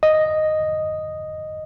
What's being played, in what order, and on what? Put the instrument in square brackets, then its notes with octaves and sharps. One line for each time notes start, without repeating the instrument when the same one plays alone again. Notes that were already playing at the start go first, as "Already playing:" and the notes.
[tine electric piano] D#5